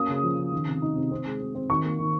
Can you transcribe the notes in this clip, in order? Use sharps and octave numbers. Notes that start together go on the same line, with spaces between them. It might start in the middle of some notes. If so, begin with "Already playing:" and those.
Already playing: A#3 C#4 D#6
C#3
F3
C#3
D#3
C3
D#4
C3
C4
G#3
C4
C4
D#3 C#6
A#3
D#3